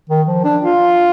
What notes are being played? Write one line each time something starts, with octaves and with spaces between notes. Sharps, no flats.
D#3
F3
D4
F4